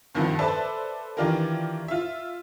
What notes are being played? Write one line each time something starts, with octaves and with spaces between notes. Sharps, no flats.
C2 G2 D#3 F3 C4
A4 B4 C5 D5 E5 A5
D#3 E3 D4 F4 G4 A#4
F4 E5